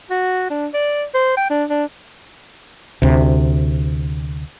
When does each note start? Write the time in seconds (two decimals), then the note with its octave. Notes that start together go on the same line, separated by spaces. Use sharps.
0.10 F#4
0.50 D4
0.74 D5
1.14 C5
1.37 G5
1.50 D4
1.70 D4
3.02 D2 C3